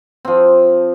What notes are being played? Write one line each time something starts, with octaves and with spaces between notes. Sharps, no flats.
F3 C4